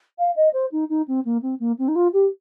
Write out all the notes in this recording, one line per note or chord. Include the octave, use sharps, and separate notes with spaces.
F5
D#5
C5
D#4
D#4
C4
A#3
C4
A#3
C4
D#4
F4
G4